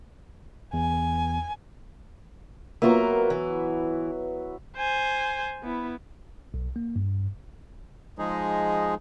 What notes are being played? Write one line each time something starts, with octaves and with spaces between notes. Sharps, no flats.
E2 G#5
F#3 A#3 B3 F4 A#4 E5
E3
C5 G#5
B3 E4
B1
A#3
G2
F3 G#3 D#4 G#4